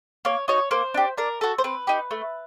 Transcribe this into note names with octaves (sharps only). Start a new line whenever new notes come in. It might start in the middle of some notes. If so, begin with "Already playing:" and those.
A#3 C#5
D#4 F#4 C#5
A#3 C5
D4 G4
D4 A#4
F#4 A4
C5
C4 B4
D#4 G4
A3